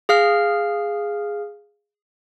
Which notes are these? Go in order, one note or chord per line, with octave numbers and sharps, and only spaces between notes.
G#4 F5 F6